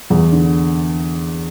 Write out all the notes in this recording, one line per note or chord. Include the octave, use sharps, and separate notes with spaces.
E2
D3